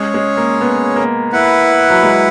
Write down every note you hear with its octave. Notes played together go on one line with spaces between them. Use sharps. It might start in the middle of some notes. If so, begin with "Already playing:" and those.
Already playing: G#3 C#4 G#4 C#5
G#3
A#3
B3
A#3
E4 B4 F#5
F#3
G#3